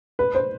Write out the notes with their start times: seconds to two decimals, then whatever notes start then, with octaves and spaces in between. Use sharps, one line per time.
0.19 B4
0.35 C5